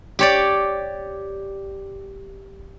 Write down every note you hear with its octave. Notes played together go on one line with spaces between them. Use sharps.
G4 C#5 D5